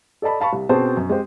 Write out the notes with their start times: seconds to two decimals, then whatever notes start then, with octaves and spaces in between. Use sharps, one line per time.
0.22 A4 D5 D#5 A5 B5
0.40 F5 A5 B5 C#6
0.53 C2
0.69 B2 C4 C#4 G#4 C5 A5
0.97 F#2
1.09 G#3 C4 G4 C5